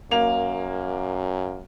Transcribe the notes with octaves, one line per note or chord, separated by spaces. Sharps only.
F#2 A#3 F7